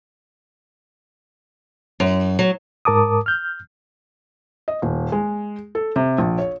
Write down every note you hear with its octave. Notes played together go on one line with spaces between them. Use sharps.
F#2
F#3
G#2 A#4 A5 D6 D#6
F6 G6
D#5
D#1
G#3
A4
C3
A#1
C#5